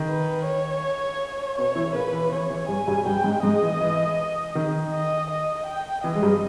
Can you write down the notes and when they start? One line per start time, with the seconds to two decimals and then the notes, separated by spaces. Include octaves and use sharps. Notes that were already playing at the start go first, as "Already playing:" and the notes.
Already playing: D#3
0.08 B4
0.46 C#5
1.58 B2 B3 C#5
1.76 E3 E4
1.94 A#2 A#3 B4
2.13 E3
2.32 E3 C#5
2.50 E3
2.68 G2 G3 G#5
2.88 G2 G3
3.06 G2 G3 G5
3.24 G#2 G#3
3.43 G#2 G#3 D#5
3.62 E3
3.81 E3
4.55 D#3
4.92 D#5
5.30 D#5
5.66 G5
6.03 E3 D#5
6.15 G#3
6.22 G2 G3